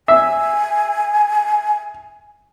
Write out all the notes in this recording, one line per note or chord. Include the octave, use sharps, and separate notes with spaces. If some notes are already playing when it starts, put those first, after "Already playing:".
E5 G#5